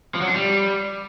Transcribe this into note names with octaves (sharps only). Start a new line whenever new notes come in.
F3
F#3
D4
G3